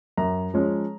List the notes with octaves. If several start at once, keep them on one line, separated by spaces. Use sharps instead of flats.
F#2 A#5
F3 G#3 C#4